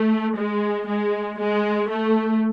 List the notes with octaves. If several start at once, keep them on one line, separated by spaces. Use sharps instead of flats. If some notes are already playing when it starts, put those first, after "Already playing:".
Already playing: A3
G#3
G#3
G#3
A3